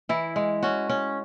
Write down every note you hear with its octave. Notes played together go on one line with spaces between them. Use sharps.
E3 E4
G#3
C#4 F#4
C#4